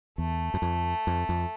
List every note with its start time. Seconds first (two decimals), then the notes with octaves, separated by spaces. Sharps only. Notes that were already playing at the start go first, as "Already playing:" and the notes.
0.18 E2 A3
0.54 F#2
0.62 F2
1.07 F2
1.29 F2